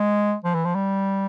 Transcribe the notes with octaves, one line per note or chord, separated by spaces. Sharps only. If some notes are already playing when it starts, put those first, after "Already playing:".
Already playing: G#3
F3
E3
F3
G3